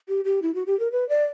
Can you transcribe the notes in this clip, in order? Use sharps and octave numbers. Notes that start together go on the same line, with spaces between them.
G4
G4
E4
F#4
G4
A#4
B4
D5